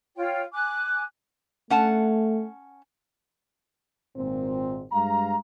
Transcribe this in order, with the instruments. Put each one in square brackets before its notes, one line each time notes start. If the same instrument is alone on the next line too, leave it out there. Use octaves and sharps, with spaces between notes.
[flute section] F4 C#5 G5
G#5 D6 F#6
[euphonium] A3 [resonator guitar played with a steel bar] C#4 F#5 A5
[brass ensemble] G#1 A#2 C4
G2 G#3 F5 A#5